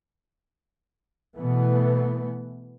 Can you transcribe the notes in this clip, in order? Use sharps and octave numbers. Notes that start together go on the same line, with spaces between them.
B2 E3 A3 B3